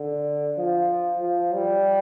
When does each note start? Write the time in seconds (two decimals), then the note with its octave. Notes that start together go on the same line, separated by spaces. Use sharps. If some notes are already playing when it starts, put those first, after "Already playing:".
Already playing: D3
0.58 F3
1.22 F3
1.54 G3